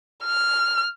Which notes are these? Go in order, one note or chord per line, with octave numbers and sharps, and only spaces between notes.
F6